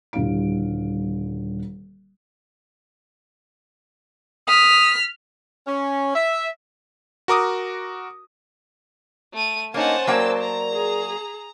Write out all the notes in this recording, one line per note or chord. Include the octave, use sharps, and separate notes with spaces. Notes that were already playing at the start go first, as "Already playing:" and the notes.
D#1 D3 G3 E4 F5 D7
D#6 F6 B6
C#4
E5
F#4 A#4 D6 D#6
A3 D#7
A#3 C#4 D#4 C5 F#5 A5
F#3 A#3 A#4 D5 G5 E6
A#5
G#4